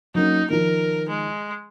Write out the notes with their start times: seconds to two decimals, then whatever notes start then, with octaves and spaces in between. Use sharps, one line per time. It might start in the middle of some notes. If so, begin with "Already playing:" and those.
0.15 F#3 A#3 C#4 D#4
0.50 D#3 F3 A#4
1.09 G#3